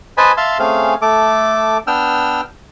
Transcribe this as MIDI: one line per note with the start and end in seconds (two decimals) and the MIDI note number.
0.17 0.32 71
0.17 0.32 72
0.17 0.32 75
0.17 0.32 80
0.17 0.32 81
0.17 0.32 83
0.37 0.58 76
0.37 0.58 77
0.37 0.58 81
0.37 0.58 84
0.59 0.94 57
0.59 0.94 60
0.59 0.94 61
0.59 0.94 68
0.59 0.94 77
1.02 1.78 57
1.02 1.78 69
1.02 1.78 86
1.87 2.41 59
1.87 2.41 62
1.87 2.41 79
1.87 2.41 88
1.87 2.41 89